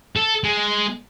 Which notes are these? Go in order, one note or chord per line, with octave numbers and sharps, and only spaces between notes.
A4
G#3